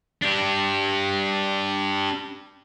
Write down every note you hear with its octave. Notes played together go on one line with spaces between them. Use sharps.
D4 G4